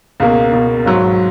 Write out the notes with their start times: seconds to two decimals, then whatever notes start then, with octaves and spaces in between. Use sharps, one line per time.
0.20 C#2 B2 A#3
0.53 C#2 B2 A#3
0.85 G#1 G#2 F#3